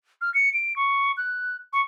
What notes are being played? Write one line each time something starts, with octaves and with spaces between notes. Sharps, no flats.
F6
C#7
D7
C#6
F#6
C#6